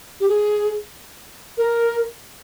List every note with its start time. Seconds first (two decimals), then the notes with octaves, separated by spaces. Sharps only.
0.20 G4
0.28 G#4
1.58 A#4